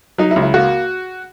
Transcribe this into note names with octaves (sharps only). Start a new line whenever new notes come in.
F#3 D#4
E4
C#2
E4
A#3 F#4